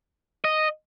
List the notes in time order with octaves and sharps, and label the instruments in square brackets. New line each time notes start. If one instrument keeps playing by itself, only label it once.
[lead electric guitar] D#5